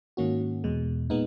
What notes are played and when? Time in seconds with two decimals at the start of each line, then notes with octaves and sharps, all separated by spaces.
0.17 G#2 D#3 A#3 C#4 F#4
0.64 E2 B2 G#3
1.10 A#2 G#3 B3 D#4